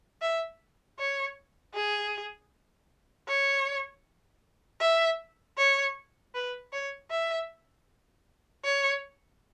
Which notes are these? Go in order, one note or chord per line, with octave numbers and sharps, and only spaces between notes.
E5
C#5
G#4
C#5
E5
C#5
B4
C#5
E5
C#5